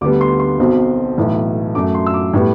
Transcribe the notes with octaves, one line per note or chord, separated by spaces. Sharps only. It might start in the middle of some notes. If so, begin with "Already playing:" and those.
D2 D3 G3 B3 D6
C6
C6
B1 B2 F#3 C4
B1 A2 E3
F#2 F#3 A3 D6
C6
E6
D6
A2 G3 B3